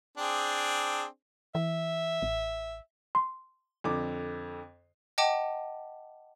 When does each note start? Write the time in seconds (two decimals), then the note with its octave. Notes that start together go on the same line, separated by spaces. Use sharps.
0.17 C4 D4 G#4
1.55 E3 E5
2.22 A1
3.15 C6
3.84 F2 D3 D6
5.18 D#5 F#5 G5 A5 D6